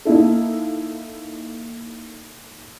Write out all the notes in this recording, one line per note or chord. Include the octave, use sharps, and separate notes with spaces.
A#3 D#4 E4 A4